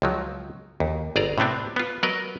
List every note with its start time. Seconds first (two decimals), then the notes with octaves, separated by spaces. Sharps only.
0.02 C#2 F3 F#3
0.80 D#2
1.16 G1 G#4 D5 A#5
1.38 A2 C3 B3 C4 D4
1.76 B3 F4
2.03 F#3 B3 A#4 B4 D#5